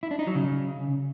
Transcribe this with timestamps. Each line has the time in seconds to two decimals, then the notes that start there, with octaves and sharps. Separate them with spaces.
0.03 E4
0.11 D4
0.19 D#4
0.27 F#3
0.35 C#3